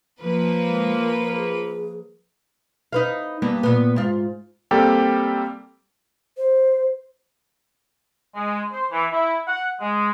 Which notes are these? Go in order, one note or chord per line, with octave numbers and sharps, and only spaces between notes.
F3 A#3 B4
G#3
A#4
G#4
D#4 B4 F5
G2 A#3 B3
A#2 B3
G#2 F4
G3 A#3 C4 G4 A4
C5
G#3
C5
E3
E4
F#5
G#3